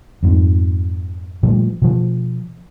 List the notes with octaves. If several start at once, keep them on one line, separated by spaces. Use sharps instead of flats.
F2 G#2
A#2 F3 G3 A3
B2 F3